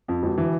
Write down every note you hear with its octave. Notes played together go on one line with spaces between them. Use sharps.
F2
E1
E3